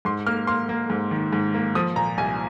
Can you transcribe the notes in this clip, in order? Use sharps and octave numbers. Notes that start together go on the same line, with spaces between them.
G#2 C6
A#3 F6
A#3 C6
A#3
G#2
D#3
G#2
A#3
F3 D#6
A#2 A#5
C2 G#5